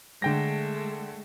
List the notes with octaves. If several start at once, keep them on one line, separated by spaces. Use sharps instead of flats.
D3 G#3 A3 G5 A#6